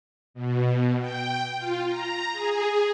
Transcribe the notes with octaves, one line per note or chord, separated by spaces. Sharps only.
B2
G5
F4
A#5
G#4